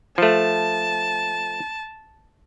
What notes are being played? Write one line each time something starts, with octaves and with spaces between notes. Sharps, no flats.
F3 A3 A5